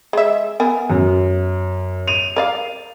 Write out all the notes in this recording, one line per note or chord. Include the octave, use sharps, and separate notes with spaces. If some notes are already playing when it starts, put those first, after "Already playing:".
G#3 E5
B3 A#4 G#5
F#2
D#7 F7
A#4 D5 F5